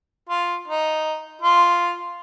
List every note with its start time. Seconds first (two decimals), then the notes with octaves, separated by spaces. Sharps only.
0.29 F4
0.68 D#4
1.42 F4